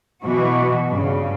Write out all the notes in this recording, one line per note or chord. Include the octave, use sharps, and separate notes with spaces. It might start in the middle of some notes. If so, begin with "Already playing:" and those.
B2 E3 F#4
G2 C#3